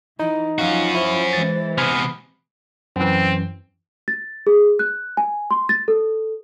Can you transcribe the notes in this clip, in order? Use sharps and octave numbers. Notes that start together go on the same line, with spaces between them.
E3 D#4 E4
F3 F#3 C#4 F4 F#4 F5
E4 C5
E3 G#3 A6
C3 B3 G#5 B5 F6
F#2 E3 C4
A6
G#4
F#6
G#5
C6
A6
A4